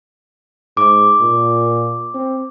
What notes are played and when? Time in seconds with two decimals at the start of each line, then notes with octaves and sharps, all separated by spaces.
0.77 G#2 D6
1.20 A#2
2.15 C4